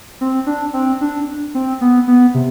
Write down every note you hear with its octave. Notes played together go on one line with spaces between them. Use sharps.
C4
D4
C4
D4
C4
B3
B3
C3